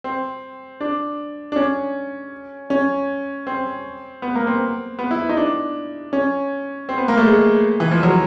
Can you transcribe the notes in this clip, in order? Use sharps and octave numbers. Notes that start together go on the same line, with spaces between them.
C4
D4
D4
C#4
C#4
C4
B3
A#3
C4
B3
E4
D#4
D4
C#4
C4
B3
A#3
A3
G#3
E3
F3
F#3